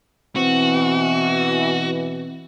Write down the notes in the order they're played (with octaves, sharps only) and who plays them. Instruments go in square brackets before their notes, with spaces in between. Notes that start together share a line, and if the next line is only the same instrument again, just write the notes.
[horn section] B2 E3 [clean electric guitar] C4 [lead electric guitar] F#4